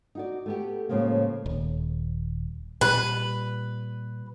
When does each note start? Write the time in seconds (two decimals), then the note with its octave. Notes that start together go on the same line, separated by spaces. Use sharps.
0.15 D#4 F#4 D5
0.46 A3 B3 G4
0.89 A2 C#3 F3 G#3 A#3
1.46 D#1
2.81 A#2 G3 B4